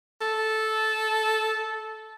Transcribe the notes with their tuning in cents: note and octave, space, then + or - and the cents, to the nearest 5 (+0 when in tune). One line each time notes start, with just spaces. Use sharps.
A4 -10